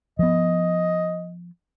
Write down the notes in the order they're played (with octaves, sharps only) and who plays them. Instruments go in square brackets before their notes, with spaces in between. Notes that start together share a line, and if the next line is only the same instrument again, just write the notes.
[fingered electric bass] F3 B3 [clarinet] D#5